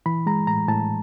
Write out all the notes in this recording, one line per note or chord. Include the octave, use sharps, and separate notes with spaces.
E3 B5
G#3 A#5
A2 A#5
A2 A5